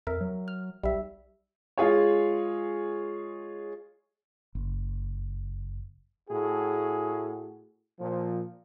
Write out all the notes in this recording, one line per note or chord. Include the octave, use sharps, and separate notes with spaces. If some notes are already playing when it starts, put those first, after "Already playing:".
F2 A#4 E5
F#3
F6
B1 G3 E5
G#3 F4 G#4 C#5
F#1
A2 F#4 G#4
A#2 F3